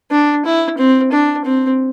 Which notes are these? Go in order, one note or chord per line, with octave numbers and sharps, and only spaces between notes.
D4
E4
C4
D4
C4